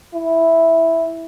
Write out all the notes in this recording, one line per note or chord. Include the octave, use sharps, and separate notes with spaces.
E4